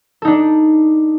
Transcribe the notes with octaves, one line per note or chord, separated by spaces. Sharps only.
D4 D#4 A4